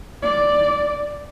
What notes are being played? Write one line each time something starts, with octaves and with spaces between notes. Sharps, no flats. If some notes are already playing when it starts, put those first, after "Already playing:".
D5